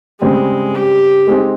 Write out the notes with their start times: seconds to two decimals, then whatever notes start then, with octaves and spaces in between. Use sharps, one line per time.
0.20 C#3 G3 G#3 C4
0.74 G4
1.27 G#3 C4 D#4 G#4